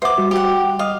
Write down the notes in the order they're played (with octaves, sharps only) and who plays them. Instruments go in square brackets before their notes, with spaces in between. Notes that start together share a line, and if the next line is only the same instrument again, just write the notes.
[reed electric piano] B4 E5 F#5 [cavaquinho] C5 D6
[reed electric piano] G3 F#4
[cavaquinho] G4 F#5
[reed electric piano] D#5 D#6 [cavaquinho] F5